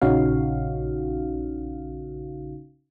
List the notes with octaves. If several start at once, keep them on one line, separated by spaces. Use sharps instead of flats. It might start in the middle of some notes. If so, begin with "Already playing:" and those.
A#1 C#3 C#4 D#4 F#4 F5